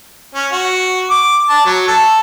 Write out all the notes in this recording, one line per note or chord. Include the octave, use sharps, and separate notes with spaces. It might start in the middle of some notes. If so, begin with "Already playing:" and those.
C#4
F#4
D6
A5
F#3
A4